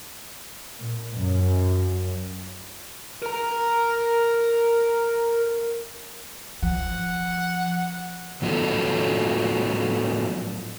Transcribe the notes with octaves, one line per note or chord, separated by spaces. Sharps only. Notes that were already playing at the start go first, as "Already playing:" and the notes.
A#2
F#2
A#4 A#5
F3 F#5
A2 F3 F#3 B3 F4 A4